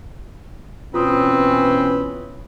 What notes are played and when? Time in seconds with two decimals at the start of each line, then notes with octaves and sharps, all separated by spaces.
0.94 B2 E3 C4 C#4 F4 B4 D#6